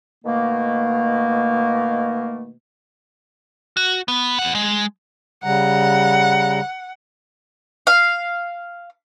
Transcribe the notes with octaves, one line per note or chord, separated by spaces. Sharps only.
B2 D#3 A3 A#3
F#4
B3
E2 F#5
G#3
C#3 G3 F#5 A#5
F5